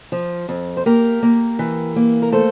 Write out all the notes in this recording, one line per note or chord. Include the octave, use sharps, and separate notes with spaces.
F3
F2
C5
A#3 G4 A#4
A#3
E3
A#3
A#4
A3 A4 C5